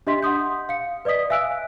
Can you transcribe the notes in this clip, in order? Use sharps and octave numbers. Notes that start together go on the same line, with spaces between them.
D4 G4 D#5 E5 C6 B6
F#5 C6 D#6 G6
F5 C#7
B4 D5 D#5 D#6 B6
E5 F5 G#5 E6 F#6 D7